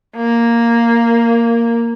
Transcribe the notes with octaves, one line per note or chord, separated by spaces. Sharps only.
A#3